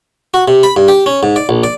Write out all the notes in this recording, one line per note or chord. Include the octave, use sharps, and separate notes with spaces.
F#4
C3
B5
G2
G4
C#4
G#2
D5
A#1
D5